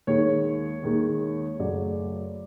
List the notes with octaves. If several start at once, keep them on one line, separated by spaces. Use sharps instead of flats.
D#2 D#3 G#3 C#5
D#2 D#3 G#3
F#2 C#3 F#3 A3 D5